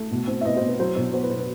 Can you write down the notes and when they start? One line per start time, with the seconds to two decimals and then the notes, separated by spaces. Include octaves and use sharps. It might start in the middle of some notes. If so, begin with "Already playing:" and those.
Already playing: A3
0.11 B2
0.28 C4
0.41 E5
0.45 B2 B4 D#5
0.57 B2 C5
0.68 B4
0.80 F#3 C5
0.96 B2 C5
1.14 B3 C5
1.23 B4
1.30 B2 C5
1.39 B4